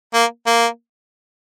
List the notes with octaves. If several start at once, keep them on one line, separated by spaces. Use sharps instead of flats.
A#3
A#3